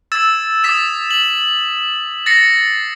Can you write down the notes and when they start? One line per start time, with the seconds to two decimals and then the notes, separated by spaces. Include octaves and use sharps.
0.12 E6 G#6 A6 E7
0.64 D#6 E6 A6 B6 E7
1.11 F#7
2.26 A6 A#6 C7 C#7